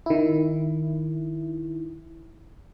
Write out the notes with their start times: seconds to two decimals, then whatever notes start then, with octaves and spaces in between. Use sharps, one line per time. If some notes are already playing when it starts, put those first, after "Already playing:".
0.06 D#3 E4